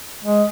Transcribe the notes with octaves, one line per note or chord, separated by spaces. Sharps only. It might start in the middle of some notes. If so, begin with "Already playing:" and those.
G#3